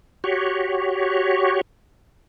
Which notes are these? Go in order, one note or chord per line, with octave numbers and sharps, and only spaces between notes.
F#4 G4 C#5